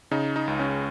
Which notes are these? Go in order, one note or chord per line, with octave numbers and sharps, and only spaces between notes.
C#3 D#4
D#4
C#2
C#4